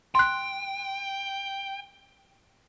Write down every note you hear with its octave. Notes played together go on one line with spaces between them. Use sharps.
G5 C6 F#6